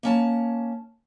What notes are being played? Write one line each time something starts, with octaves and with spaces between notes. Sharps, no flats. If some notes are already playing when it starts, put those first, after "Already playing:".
A#3 C#4 A5